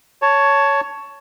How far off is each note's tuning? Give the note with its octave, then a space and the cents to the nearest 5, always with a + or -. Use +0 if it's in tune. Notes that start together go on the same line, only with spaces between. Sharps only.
C#5 +10 A5 +5